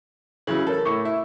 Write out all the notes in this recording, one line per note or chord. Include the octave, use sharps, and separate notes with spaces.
C#3 E3 F#3 F#7
A4 A#4 C#5
A2 C#6 D6 C#7
E4